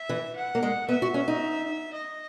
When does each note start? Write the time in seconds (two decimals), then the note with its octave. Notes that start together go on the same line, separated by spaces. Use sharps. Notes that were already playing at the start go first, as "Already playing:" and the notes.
Already playing: E5
0.09 E3
0.36 F#5
0.55 A#3
0.63 G#3
0.89 B3 E5
1.02 F#4
1.14 C#4
1.28 D#4
1.93 D#5